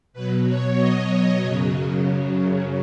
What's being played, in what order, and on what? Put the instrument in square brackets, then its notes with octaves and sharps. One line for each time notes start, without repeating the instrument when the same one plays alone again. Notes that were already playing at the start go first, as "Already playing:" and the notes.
[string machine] B2 F#3 B4
C#5
D#5
F#2 C#3 F#3